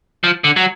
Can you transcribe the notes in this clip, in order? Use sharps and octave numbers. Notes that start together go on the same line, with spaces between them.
F3
D3
F#3